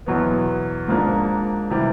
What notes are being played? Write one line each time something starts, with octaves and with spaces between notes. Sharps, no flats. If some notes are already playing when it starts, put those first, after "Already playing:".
E2 B2 F#3 B3
G#2 F3 A#3 D4
C3 E3 G3